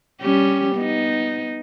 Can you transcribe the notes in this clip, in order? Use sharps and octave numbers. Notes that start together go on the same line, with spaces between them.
G3 C#4 G4
B3 D#4